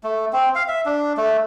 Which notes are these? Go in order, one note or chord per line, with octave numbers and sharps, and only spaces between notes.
A3
C4
F5
E5
D4
A3